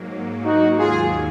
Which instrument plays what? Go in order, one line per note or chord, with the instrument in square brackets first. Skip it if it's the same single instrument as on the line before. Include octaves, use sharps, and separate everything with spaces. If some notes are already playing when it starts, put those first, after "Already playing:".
Already playing: [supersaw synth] G#2 F#3 A#3
[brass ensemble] D#4 F#4
[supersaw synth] D#2 D#3 F#3 [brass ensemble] F4 G#4